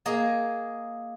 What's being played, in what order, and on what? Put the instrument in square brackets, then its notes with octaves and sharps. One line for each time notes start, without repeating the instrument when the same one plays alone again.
[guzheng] A#3 G#4 D#5